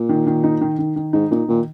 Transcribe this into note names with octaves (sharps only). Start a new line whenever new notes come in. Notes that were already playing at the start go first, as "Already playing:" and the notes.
Already playing: A#2
D#3
D#3
D#4
D#3
D#3
D#3
G#2 D#4
A#2 D#4
A#2 D#3